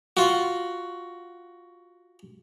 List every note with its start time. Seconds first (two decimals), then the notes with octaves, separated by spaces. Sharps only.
0.17 F4 F#4